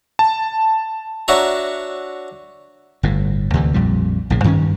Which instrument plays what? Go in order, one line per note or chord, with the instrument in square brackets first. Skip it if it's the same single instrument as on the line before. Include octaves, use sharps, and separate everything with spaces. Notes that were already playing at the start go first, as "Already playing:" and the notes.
[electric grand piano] A5
[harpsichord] D4 F#4 C#5 E5 A#5
[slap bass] G1 A2
D2 C3 E3
A#1 F2 A#2 G3
A#1 A2 C#3
G2 D#3 C4 C#4